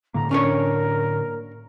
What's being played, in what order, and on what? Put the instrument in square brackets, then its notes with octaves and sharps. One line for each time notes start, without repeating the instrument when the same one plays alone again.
[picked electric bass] A2 D3 A#3 [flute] A#5
[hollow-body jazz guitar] C#4 D4 C#5 [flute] A#4